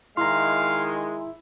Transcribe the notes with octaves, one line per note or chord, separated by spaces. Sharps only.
D#3 G#3 E4 F5 A#5 C6